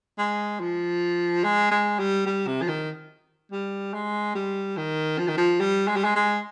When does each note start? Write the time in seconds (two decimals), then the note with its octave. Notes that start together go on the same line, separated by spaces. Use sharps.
0.18 G#3
0.60 F3
1.44 G#3
1.71 G#3
1.99 G3
2.26 G3
2.47 C3
2.62 F3
2.68 D#3
3.52 G3
3.94 G#3
4.35 G3
4.77 D#3
5.18 F3
5.28 D#3
5.37 F3
5.60 G3
5.88 G#3
5.96 G3
6.04 G#3
6.15 G#3